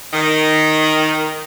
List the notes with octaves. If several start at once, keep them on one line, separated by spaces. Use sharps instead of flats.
D#3